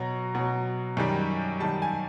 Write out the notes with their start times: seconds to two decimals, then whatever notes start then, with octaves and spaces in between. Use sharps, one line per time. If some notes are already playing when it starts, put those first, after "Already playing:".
Already playing: B2 F#3 A#5
0.35 B2 F#3
0.97 F#2 D#3 G3
1.60 F#2 D#3 G3 A5
1.82 G#5